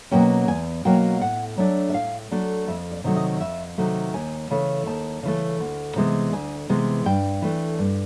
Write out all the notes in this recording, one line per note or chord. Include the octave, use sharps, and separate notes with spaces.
B2 F#3 A#3 C#4 G5
E2 G#5
B2 F#3 A#3 C#4 G5
A2 F#5
F#3 A3 D4
E5
A2 F5
F#3 A3 D4
F2 E5
D5
C3 D#3 F#3 A3
D#5
F2 E5
C3 D#3 F#3 A3
D#2 G#5
C#3 E3 A3
D#2 A5
C#3 E3 A3
D2
C3 E3 G#3 B3
D2 G#5
C3 E3 G#3 B3
G2 G5
E3 A3 D4
G2